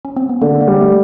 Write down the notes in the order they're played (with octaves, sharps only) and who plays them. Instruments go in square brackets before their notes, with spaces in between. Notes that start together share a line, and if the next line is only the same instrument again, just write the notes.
[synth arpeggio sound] C#4
C4
B3
[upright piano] D3 [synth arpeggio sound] A#3
[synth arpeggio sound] A#3
[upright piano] G3
[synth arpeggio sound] A3